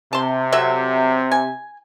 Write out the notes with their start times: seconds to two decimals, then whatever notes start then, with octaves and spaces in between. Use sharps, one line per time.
0.13 C3 A5 C6
0.52 F#3 A4 E5
1.31 G#5